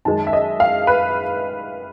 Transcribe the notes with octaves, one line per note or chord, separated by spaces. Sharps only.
F#2 D#3 G#3 A5
E5
D#5
F5
B4